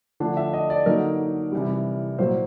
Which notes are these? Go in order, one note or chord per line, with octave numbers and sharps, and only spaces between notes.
D3 F3 A3 D4
E5
D#5
D5
D3 F#3 A#3 D#4 A#4
C3 E3 G3
A#2 F#3 A#3 C5